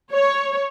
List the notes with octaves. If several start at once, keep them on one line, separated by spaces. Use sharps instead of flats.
C#5